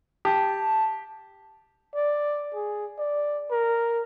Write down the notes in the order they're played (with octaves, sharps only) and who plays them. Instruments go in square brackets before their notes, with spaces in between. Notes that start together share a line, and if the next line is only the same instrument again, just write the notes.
[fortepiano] G4 [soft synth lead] A5
[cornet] D5
G#4
D5
A#4